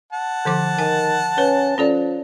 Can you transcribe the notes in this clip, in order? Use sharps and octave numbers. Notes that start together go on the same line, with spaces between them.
F#5 A5
D3 F3 D6
D#3 G#5
C#4 B4
F3 C#4 A4 D5